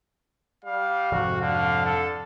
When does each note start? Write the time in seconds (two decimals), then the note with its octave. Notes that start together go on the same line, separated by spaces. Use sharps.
0.65 G3 F5
1.12 F2 G#2 C3 F#4
1.42 D3 F5
1.85 A4